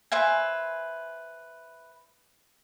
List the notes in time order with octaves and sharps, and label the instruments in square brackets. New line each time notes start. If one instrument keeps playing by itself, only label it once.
[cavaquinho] B4 C5 E5 G#5